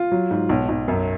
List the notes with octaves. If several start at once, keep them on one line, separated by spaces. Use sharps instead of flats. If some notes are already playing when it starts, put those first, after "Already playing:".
Already playing: F4
F#3
G#2
B1
B1
F#2